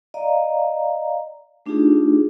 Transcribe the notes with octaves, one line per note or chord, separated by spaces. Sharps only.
D5 D#5 F5 A#5
A3 D4 D#4 F4 G4 G#4